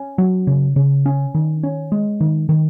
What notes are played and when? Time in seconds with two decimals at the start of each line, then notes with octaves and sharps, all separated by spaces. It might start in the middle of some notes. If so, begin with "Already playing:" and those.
Already playing: C#4
0.18 F#3
0.47 C#3
0.76 C#3
1.06 C#4
1.34 D#3
1.63 C#4
1.92 G#3
2.21 D#3
2.49 D#3